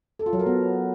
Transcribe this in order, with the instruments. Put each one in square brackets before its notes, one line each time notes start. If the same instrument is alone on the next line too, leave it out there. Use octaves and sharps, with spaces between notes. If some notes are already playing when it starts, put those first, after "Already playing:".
[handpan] A4
F4
F#3
A#4
B3